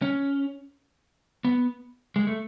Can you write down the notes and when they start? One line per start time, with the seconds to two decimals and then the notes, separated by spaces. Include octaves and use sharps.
0.02 C#4
1.45 B3
2.16 G#3
2.27 A3